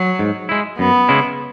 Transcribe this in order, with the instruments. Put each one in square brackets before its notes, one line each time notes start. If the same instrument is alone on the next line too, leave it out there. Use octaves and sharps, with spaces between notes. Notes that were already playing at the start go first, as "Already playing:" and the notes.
Already playing: [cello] F#3
[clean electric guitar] G#2
G#3 E4
[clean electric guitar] F#2 [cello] B3
[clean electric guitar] C#3 G#3 E4